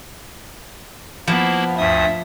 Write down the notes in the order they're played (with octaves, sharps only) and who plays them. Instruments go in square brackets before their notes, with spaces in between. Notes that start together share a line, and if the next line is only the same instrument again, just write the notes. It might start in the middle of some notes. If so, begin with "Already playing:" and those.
[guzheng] F3 [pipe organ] A#3 E4 [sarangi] B3
[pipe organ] D2 G2 D#6 [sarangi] E5